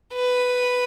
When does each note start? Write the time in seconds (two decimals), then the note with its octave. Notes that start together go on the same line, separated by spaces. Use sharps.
0.14 B4